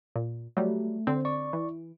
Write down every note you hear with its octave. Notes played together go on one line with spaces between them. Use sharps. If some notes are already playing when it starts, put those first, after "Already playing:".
A#2
F#3 G3 A3
D3 C4 C5
D5 C#6
E3